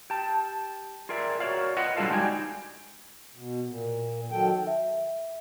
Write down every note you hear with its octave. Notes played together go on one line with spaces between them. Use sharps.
G4 A5
F4 G#4 A#4 D5 E5
F#4 A#4 C#5 D5 F5
F4 B4 D#5 F#5
F#3 G3 D4 F4 A4 F5
G#3 D#4 F#4 G4 D5 G#5
B2
A#2
D#3 F#3 A4 G5
E5